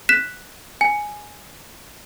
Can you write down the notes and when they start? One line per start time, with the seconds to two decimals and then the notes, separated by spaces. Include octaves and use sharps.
0.09 F#6 B6 E7
0.81 G#5